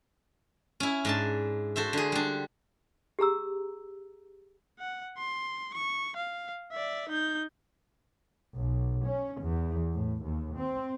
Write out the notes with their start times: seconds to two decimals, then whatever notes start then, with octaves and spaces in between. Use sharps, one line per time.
0.80 C#4 E4
1.05 G#2 D4 A5
1.76 F#4 A4 C5 E5
1.93 D3 G#4
2.12 G3 D4
3.19 G4 G#4 A#5 E6
4.79 F#5
5.18 C6
5.74 C#6
6.17 F5
6.72 D5 E5
7.09 D#4 G6
8.56 B1
9.05 C#4
9.41 E2
9.91 A2
10.23 D#2
10.57 C4